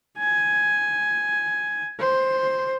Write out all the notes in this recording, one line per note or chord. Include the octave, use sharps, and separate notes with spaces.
G#5
C5